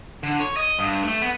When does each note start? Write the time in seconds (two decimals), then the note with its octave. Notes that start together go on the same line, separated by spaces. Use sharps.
0.23 D3
0.40 C#5
0.57 D#5
0.79 G2
1.04 A3
1.22 B3